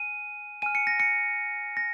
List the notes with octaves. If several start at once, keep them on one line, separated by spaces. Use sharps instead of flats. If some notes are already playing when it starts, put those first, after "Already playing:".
Already playing: G#5 F6 D#7
G#5 F6 D#7
C#7
A#6
C#7
A#6